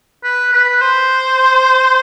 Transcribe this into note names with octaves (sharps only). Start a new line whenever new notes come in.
B4
B4
C5